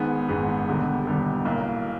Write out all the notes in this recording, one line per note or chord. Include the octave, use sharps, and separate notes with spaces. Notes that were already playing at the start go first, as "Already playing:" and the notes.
Already playing: G#1 G#2 D#3 G#3 B3
G#1 G#2 D#3 G#3 B3
E1 D#2 D3 G3 B3
E1 D#2 D3 G3 B3
B1 A2 F#3 A#3